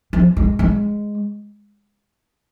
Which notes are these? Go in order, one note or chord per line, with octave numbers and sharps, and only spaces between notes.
F3
G#3
G#3